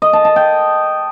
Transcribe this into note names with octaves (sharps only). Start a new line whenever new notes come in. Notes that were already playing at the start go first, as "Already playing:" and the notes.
D#5
A5
A5
G5